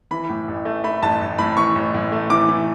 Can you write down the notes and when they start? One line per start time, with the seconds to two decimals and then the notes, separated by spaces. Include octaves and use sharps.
0.11 E3 B5
0.29 A2
0.48 A1
0.65 A3
0.84 A3 B5
1.02 A1 A5
1.21 A1
1.38 A2 B5
1.57 E3 C#6
1.75 A1
1.94 A2
2.12 A3
2.30 E3 D6
2.48 E3